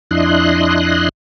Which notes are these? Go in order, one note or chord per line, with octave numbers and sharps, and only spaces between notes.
F2 D4 E4 D#5 C6 F#6